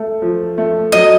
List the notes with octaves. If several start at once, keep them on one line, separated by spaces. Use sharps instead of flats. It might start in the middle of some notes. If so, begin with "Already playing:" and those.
Already playing: A3
F3
A3
F#3 D#5